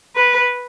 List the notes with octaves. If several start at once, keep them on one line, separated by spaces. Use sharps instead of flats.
B4